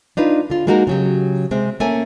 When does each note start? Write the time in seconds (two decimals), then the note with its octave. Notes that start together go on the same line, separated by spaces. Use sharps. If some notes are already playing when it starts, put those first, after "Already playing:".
0.17 D4 D#4 F4 B4
0.50 D3 F4
0.67 G#3 A#3 D#4 F#4 G#4 A#4
0.87 C#3 F#3 G4
1.51 C3 G#3 C4
1.80 A3 A#3 C#4 G#5